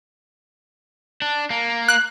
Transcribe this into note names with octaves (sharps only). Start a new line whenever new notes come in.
D4
A#3
F#6